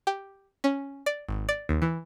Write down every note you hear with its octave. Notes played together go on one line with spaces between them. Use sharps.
G4
C#4
D5
G#1
D5
D#2
E3